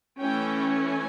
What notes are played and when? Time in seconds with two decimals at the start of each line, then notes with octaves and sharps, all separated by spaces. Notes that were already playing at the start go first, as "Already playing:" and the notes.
0.19 E3 A3 C#4 G5
0.74 G#5